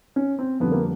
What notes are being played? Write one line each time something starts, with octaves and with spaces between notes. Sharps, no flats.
C#4
C4
F2 D3 G3 B3
A#3